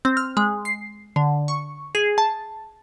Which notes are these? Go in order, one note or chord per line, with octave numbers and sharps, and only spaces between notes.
C4
F6
G#3
C7
D3
C#6
G#4
A5